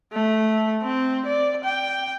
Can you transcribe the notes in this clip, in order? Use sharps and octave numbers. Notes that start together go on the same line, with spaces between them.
A3
C4
D5
G5